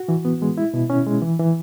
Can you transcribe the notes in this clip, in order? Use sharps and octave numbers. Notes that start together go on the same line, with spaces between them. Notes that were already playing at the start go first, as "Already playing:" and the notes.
Already playing: F#4
E3
B3
G#3
E4
B2
C#4
G#3
E3
E3